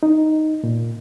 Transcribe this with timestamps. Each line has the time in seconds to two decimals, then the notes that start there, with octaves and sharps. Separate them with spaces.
0.03 D#4
0.64 A#2